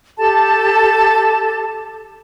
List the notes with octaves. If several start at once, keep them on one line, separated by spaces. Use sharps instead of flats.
G4 A4 A5